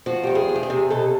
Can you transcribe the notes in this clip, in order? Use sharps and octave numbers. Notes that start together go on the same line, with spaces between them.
F3 F#4
E2 G4
G#4
E2
G4
G#4
C3
B2 A4